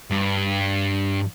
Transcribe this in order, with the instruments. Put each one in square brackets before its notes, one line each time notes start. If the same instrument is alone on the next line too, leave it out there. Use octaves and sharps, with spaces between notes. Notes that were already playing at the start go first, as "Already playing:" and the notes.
[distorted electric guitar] G2